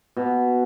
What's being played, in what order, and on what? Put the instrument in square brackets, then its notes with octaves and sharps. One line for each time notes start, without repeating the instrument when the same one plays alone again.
[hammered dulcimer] B2